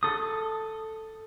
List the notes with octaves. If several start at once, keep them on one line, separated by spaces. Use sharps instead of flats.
A4 D#6